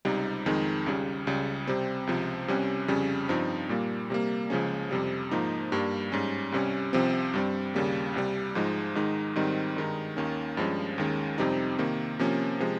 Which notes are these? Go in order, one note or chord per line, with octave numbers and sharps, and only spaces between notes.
C#2 C3 G3 C4 D#4
F2 D#3 G#3 D#4
C#2 C#3 G3
C#2 C#3 G3
C3 G3 C4
C#2 C3 F3
C2 C3 G3 C#4
F2 C#3 G3 C#4
G2 F3 C4 D#4
A#2 G3 A#3
C3 G3 A#3
C#2 C#3 F3 G#3 C#4
F2 C3 G3
G#2 F3 A#3 D#4
G2 G3 A#3
G#2 G3 C#4
C2 C3 G3 C#4
C2 C3 F3 C4
G2 G3 C4
D#2 C#3 G3 A#3
C2 C3 G3
G#2 F3 G#3 D#4
G#2 D#3 G#3 D#4
G#2 D#3 G3 C4 D#4
G2 D#3 G#3 D#4
D#2 D#3 A#3 C#4
G2 F3 G#3 C#4
D#2 D#3 G#3 C#4
F2 C3 G3 C4 D#4
C3 D#3 A#3
C3 F3 A#3 C#4
C3 F3 G#3